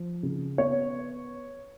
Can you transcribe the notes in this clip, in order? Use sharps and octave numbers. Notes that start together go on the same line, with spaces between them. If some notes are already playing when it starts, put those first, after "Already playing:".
Already playing: F3
C#3
B3 C#5